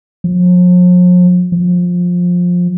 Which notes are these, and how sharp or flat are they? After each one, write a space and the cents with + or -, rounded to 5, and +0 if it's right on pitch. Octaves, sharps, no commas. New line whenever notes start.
F3 +45
F3 +20